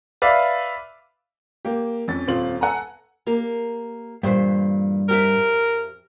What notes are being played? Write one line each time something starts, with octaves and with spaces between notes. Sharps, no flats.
B4 D5 E5 F5
A#3 G4
F2 C#4 A6
D#1 C4 F4 F#7
A4 F#5 G#5 A#5
A#3 G4 A#4
G2 A#2 E3 C5
F2 G4 A#4 E5